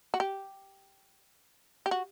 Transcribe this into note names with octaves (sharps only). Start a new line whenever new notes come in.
F#4
G4
G4
F#4